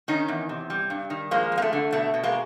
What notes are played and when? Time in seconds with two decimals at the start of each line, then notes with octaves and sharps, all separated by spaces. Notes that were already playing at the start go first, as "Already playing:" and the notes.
0.08 D#3 C#4 D#4
0.28 E2
0.49 C3
0.70 G3
0.90 G2
1.10 D#3
1.31 F3 G#3 A#3
1.52 F2
1.57 A#3
1.62 A3
1.73 D3
1.93 B2 A3
2.14 B2
2.23 G#3 A#3